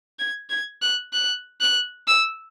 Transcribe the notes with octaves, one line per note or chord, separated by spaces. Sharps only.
G#6
G#6
F#6
F#6
F#6
E6